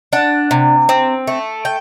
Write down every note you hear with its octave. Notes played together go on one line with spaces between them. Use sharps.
D4 F#5
C3
C4
A3
G5